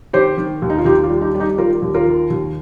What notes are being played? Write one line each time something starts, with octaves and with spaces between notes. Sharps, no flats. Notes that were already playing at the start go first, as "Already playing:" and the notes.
D#3 G4 C5
D#3
D#2
D#4
F4
D#2 D#4 G4
F4
G3
D#4 G4
G3
D#4 G4
D#3 F4 A#4
D#2
F4 A#4
D#3
D#2